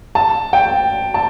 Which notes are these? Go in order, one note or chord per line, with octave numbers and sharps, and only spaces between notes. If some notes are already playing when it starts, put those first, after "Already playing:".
A5
G5
A5